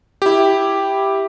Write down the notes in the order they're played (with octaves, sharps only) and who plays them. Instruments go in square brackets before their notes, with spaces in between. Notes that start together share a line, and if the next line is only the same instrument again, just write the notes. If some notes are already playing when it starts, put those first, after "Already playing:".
[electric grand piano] E4 G4